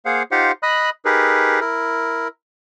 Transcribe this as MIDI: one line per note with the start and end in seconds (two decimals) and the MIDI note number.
0.05 0.23 58
0.05 0.23 68
0.05 0.23 72
0.05 0.23 77
0.05 0.23 78
0.31 0.52 63
0.31 0.52 65
0.31 0.52 67
0.31 0.52 72
0.31 0.52 77
0.31 0.52 78
0.63 0.90 75
0.63 0.90 83
0.63 0.90 87
0.63 0.90 90
1.05 1.60 63
1.05 1.60 67
1.05 1.60 68
1.05 1.60 70
1.05 1.60 71
1.61 2.28 64
1.61 2.28 70